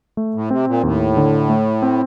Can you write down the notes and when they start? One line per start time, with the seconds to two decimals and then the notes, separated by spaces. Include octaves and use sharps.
0.17 A3
0.34 A2
0.51 C3 C4
0.67 A#2
0.83 D#2 A2
1.17 D3
1.49 A3
1.82 C4